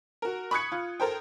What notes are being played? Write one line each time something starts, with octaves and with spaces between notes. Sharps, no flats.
F#4 A#4
B5 C#6 D#6 F#6 G#6 C#7
F4
A4 A#4 C5 G5